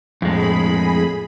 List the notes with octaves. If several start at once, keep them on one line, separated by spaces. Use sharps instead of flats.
F2 A2 G#3 G#4 B5